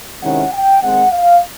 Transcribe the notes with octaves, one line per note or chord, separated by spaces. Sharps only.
C3 D#3 G#3 C#4 E4 F#5
G5
D#3 G#3 C4 F#5
F5